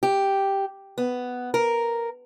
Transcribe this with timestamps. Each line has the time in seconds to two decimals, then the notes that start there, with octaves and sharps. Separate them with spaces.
0.03 G4
0.98 B3
1.54 A#4